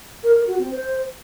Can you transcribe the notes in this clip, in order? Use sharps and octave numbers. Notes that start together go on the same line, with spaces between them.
A#4
A#4
F#4
C4
C5